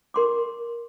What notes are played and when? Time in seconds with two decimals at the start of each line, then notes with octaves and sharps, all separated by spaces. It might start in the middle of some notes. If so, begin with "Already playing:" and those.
0.14 A#4 C6 D6